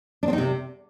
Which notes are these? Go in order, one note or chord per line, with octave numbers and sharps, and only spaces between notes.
D4
C4
D#4
C3